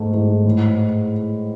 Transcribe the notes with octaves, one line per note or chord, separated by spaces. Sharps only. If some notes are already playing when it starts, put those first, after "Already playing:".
Already playing: G#2 A3
G#2
A2